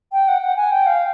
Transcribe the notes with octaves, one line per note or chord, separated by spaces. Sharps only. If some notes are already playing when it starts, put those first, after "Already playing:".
G5
F#5
F#5
G#5
G5
F5